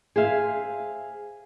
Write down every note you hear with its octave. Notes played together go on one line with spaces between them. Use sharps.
G#4 C5 E5 F5